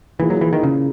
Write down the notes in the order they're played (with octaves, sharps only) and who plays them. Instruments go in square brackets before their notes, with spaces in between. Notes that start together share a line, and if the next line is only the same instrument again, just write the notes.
[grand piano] A#2 A#3 E4 G#4 [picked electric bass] E3
[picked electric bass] F#3
E3
D#3
C#3